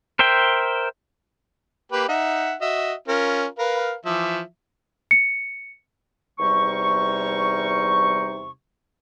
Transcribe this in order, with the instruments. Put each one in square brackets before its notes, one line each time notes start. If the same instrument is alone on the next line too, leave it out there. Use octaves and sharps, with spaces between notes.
[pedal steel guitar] A#4 C5 E5 G5
[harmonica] A#3 G4 B4
D#4 E5 F#5
F#4 D#5 E5
C#4 F4 A#4
A#4 B4 F5
E3 F3 E5
[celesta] C#7
[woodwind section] E2 C3 G3 D#4 C#6